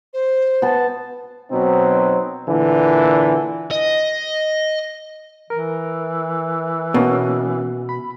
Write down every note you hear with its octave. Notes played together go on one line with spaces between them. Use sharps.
C5
B3 A5
B2 F#3 C4 D#4
A#2 D3 E3
D#5
E3 A#4
B2 A#3 B3 C#4
B5